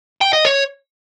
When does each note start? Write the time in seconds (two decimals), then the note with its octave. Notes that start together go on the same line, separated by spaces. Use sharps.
0.21 G5
0.33 D#5
0.45 C#5